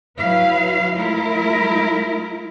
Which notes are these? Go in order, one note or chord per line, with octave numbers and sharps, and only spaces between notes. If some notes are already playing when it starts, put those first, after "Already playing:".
F#3 E4 B4 F5
F#3 G#3 A3 E4 F4 A#4